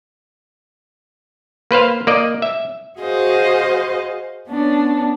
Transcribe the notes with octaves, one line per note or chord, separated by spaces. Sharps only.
A#3 B4 C5 F5
A#3 D5 D#5
E5
F#4 G#4 C5 D#5 F5
B3 C#4 D4